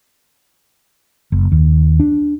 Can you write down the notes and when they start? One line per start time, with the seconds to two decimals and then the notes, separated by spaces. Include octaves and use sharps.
1.32 F#1
1.52 D#2
2.00 D4